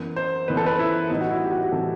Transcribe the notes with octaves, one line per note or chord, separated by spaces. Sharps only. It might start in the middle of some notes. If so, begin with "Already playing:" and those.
Already playing: F#2 E3 B3
C5
F#2 E3 B3 B4
A4
B4
E4
A2 E3 G3 B3 D#4
F#4
E4
G4
F#4
G4
A2 E3 G3 B3 A4